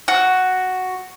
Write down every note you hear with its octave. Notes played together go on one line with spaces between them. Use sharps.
F#4